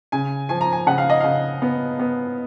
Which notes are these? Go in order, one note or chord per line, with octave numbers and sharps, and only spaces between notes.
C#3 G#5
F3 G#5
A#5
G#5
C#3 F#5
F5
D#5
C#3 F5
B3
B3